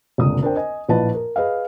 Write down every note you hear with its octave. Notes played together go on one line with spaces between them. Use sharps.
F1 C#2 A#2 D3 D#6
D4 A#4 C5 G5
D#5 G#5
A#1 A2 F3 B4 D#5 A5
A#4
G#4 B4 D#5 F5